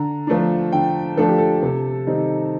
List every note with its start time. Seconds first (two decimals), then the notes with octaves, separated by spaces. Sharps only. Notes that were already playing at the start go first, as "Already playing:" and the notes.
Already playing: D3 A#5
0.27 F3 A3 D4
0.72 D3 G5
1.17 F3 A3 D4 A4
1.28 G4
1.38 A4
1.62 C3
2.07 D#3 G3 C4 D#4